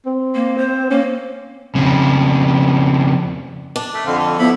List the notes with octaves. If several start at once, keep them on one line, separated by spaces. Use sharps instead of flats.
C4
A#3
C5
A#3 C#4
F2 C#3
D4
A3
F2 D3 C4 F5
A4
F3 B3 E4 B5